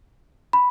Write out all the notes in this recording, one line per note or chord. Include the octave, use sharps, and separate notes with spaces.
B5